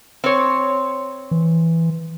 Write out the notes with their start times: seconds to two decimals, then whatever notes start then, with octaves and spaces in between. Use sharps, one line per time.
0.24 C4 C#5
1.31 E3